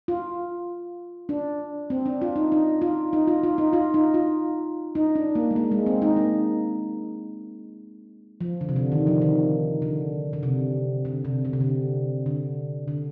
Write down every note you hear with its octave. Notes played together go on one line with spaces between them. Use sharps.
F4
D4
C4
D4
F4
D#4
D#4
F4
D#4
F4
F4
D#4
F4
D#4
F4
D#4
D4
A#3
G#3
A#3
G#3
C4
D#4
A#3
F3
D3
C3
D3
D#3
F3
D#3
D3
D3
C3
D3
C3
D3
C3
D3
D3
D3